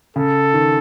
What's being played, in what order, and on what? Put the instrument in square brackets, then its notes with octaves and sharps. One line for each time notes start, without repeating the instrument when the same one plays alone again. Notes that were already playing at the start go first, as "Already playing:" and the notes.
[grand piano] C#3 [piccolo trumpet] A4
[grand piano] D#3